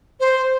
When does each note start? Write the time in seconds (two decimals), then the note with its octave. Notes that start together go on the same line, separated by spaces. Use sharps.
0.20 C5